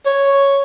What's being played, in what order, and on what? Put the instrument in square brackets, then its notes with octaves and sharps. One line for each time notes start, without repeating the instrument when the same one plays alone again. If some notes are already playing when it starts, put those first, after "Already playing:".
[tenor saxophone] C#5